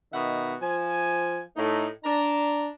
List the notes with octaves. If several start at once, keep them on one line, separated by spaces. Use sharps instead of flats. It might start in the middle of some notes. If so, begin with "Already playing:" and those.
B2 D#3 E5 F#5 B5
F3 G#5
A2 A3 D#4
D4 A#5